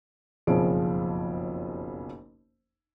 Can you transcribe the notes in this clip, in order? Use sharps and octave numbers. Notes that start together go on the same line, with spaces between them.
F#1 B1 F2 F3 G#4 D7